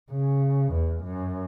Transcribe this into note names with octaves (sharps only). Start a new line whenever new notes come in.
C#3
E2
F#2